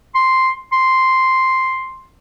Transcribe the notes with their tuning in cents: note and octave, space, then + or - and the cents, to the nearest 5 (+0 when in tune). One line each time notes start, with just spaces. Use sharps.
C6 +0
C6 +0